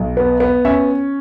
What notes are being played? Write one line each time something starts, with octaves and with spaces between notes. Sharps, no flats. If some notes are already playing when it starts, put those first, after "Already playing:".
Already playing: B1
B3
B3
C#4 E5